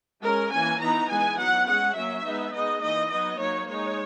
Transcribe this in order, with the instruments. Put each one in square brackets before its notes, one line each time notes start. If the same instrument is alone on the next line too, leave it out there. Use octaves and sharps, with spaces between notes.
[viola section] G#3 C#4 A#4
E3 A#3 C#4 G#5
E3 B3 D#4 A#5
E3 G#3 B3 D#4 G#5
F#3 B3 D#4 F#5
G#3 C#4 F#5
F#3 A#3 C#4 E5
G#3 B3 D#4
G#3 B3 D#4 D#5
E3 A#3 D#4 D#5
F#3 B3 D#4 D#5
F#3 A#3 D#4 C#5
G#3 D#4 C#5